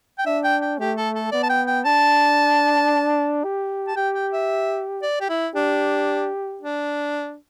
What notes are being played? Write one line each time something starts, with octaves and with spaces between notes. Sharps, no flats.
G5
D4 E5
G5
G5
A3 G4
A4
A4
B3 D5
A5
G5
G5
D4 A5
G4
A5
G4 G5
G5
E5
D5
G4
E4
D4 G4
D4